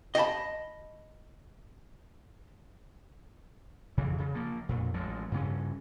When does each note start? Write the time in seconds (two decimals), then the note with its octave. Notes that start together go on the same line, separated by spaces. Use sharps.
0.15 D#5 F5 G5 A5 B5
3.97 F2 C#3 E3
4.18 C#3
4.34 F3 A#3
4.69 F2 A#2
4.94 A1 F3 F#3 G#3
5.32 G2 C#3 A#3 C#4